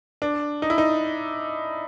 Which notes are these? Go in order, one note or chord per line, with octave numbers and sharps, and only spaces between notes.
D4
D#4
E4
D#4